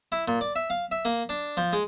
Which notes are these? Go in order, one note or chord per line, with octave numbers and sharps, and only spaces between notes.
E4
A#2
D5
E5
F5
E5
A#3
D4
F3
G#3